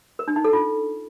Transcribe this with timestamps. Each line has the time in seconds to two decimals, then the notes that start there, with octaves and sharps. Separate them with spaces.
0.19 A#4
0.28 D4
0.36 D#4
0.44 A4
0.53 F4